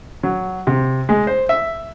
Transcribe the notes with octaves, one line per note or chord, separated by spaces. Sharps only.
F#3
C3
G#3
C5
E5